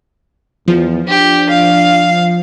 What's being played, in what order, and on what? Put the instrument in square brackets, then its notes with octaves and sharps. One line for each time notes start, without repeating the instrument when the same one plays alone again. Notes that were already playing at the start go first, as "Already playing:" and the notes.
[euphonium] E2 [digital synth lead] F3
[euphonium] D4 [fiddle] G4
[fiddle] F5